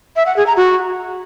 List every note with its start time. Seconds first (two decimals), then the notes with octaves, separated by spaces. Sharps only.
0.16 E5
0.26 F#5
0.36 G#4
0.47 A#5
0.57 F#4